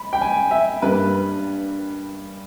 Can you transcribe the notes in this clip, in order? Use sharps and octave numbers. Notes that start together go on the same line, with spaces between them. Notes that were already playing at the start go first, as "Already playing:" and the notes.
Already playing: B5
G5
G#5
E5
G2 G3 A#3 B4